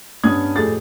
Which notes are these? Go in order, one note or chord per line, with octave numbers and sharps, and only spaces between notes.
G2 B3 C#4 D#6 G#6
F2 A2 G4 G#4 A6